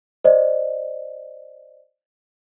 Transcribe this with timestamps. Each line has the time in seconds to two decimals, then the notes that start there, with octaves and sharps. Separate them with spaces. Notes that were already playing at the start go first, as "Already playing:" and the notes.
0.24 C5 D5 D#5